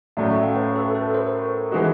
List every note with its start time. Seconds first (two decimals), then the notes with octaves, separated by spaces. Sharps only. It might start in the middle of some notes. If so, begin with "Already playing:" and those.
0.17 A2 F#3 A3 C#4 D5 E5
0.30 E5 F#5
0.43 F5 G5
0.55 B4 C#5
0.76 A4 B4
0.95 A4 B4
1.14 A#4 C5
1.72 E3 G#3 B3 D#4 F#4